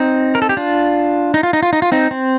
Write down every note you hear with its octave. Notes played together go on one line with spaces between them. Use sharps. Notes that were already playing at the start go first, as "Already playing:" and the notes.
Already playing: C4 D#4
A#4
A4
G4
D4 F4
D#4
F4
D#4
F4
D#4
F4
C4 D#4
C4